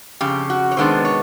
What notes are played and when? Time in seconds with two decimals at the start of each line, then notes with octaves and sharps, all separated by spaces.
0.21 F2 C#3 G4
0.50 F#4
0.71 C#5
0.77 C3 D#3 G#3 B3 D4 C5
1.05 C#5